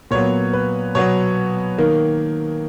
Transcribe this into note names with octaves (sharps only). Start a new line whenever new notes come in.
A#2 F#3 B3 C#5
B4
B2 F#3 B3 C#5
D#3 A#3